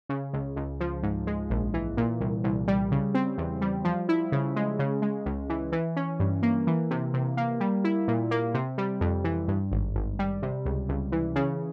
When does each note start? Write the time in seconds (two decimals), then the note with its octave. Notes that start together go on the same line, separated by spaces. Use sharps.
0.09 C#3
0.33 C#2
0.56 C#2
0.80 F3
1.03 G#2
1.27 G#3
1.50 A#1
1.74 E3
1.97 A#2
2.21 C2
2.44 C2
2.68 G3
2.91 C#3
3.14 C4
3.38 E2
3.61 G3
3.85 F3
4.09 E4
4.32 C#3
4.56 G#3
4.79 C#3
5.02 G#3
5.26 C#2
5.49 E3
5.72 E3
5.96 C#4
6.20 G2
6.43 A#3
6.67 E3
6.91 C3
7.14 C3
7.37 A#3
7.60 G3
7.84 E4
8.08 A#2
8.31 A#3
8.54 C3
8.78 G3
9.01 F2
9.24 E3
9.48 G2
9.71 G#1
9.95 G#1
10.19 G3
10.42 C3
10.65 C#2
10.89 C#2
11.12 E3
11.36 C#3